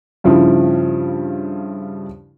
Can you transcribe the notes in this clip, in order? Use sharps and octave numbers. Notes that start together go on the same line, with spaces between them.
G2 C#3 F3 E4